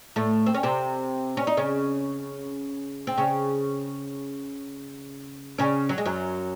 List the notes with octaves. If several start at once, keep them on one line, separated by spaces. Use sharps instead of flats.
A2 A3
C4
C#4
C3 C4
C#4
D#4
C#3 C#4
C4
C#3 C#4
C#3 C#4
F#3
G#3
F#2 F#3